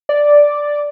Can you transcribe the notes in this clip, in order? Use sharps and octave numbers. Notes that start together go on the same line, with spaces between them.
D5